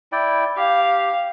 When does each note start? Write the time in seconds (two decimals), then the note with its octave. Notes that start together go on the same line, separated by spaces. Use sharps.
0.12 E4 D5 G5
0.57 G4 F5